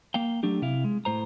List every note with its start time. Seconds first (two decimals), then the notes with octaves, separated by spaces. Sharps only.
0.14 A#3 F5 G5
0.43 F#3 A3 D4 G4
0.62 C3 E4 F5
0.84 G#3
1.05 A2 C5 A#5